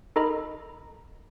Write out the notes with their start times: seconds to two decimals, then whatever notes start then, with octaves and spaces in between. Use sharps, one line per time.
0.16 D#4 A4 A#4 D#5 A#5 B5